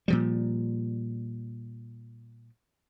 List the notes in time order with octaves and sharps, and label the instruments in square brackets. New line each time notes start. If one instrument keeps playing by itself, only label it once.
[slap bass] A#2 F3 G3